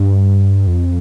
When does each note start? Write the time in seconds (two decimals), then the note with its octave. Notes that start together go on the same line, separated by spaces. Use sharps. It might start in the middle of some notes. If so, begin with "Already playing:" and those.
Already playing: G2
0.67 F2